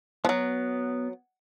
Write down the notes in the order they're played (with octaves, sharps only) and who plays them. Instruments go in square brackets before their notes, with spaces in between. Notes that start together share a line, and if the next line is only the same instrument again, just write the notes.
[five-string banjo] F3 F#3 [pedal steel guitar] B3